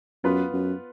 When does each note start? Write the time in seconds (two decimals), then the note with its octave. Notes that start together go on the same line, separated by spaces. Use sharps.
0.24 F#2 B3 F4 B4
0.53 F#2